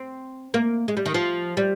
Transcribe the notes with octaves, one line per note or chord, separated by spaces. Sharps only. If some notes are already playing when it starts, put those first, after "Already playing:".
Already playing: C4
A#3
G#3
G3
D#3
F3
G3